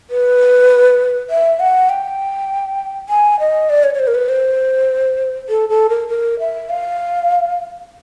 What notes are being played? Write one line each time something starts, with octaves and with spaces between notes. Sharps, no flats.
B4
E5
F#5
G5
G#5
D#5
D5
C#5
C#5
C5
A#4
B4
C5
A4
A4
A#4
A#4
E5
F5